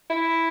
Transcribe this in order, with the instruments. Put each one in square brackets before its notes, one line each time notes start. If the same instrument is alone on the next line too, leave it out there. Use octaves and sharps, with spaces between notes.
[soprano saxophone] E4